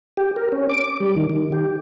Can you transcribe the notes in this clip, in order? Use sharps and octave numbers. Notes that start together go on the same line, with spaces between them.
G4
A#4
C#4
D6
G3
D#3
D#3
G4